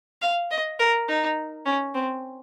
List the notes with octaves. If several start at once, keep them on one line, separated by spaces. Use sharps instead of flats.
F5
D#5
A#4
D#4
C#4
C4